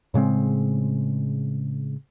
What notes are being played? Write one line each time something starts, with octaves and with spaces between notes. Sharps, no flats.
A2 C#3 G#3 C4